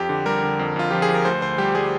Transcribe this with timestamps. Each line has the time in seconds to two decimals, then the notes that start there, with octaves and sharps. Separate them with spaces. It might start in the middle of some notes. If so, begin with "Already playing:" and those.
Already playing: F2 G4
0.09 D3
0.26 G3 A#4
0.43 D3
0.59 F2
0.76 F2 F4
0.90 F3 G4
1.02 G#4
1.09 F3
1.14 A#4
1.25 D2 C5
1.42 D2 C5
1.58 G3 G4
1.75 G3 G#4